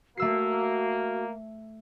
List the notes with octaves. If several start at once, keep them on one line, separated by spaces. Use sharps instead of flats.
A3 A#3 F#4 E6 C7